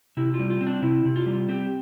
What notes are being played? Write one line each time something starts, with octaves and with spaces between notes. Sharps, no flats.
C3 E4
F4
G3
F4
C4
D4
C3 E4
C3
F4
G3
C4 G4